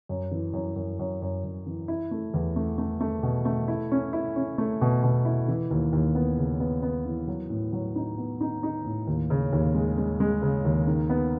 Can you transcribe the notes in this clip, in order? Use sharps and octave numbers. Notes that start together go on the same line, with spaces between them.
F#2
E3
F#2
F#2
F#2
F#2
F#2
E3
E4
A3
E2
A3
A3
A3
B2
A3
E4
C#4
E4
C#4
A3
B2
B2
E4
E3
D#2
D#2
B3
C#3
B3
B3
E3
F#3
A2
F#3
D#4
B3
D#4
D#4
A2
D#2
C#3
D#2
G#3
G#3
G#3
C#3
D#2
D#3
B3